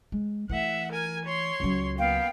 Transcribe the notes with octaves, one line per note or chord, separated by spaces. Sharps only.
G#3
E3 A3 E5 F#5
A#4 G#5
C#5 C6
C#2 F#3
A#3 B3 F5 G5